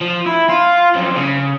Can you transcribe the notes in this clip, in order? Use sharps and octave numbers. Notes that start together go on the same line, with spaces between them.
F3
E4
F4
F#2 F3
C#3